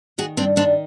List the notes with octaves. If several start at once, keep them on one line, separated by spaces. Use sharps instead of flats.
D#3 F#4 G#4
G2 C4 D4
D#3 C4 D4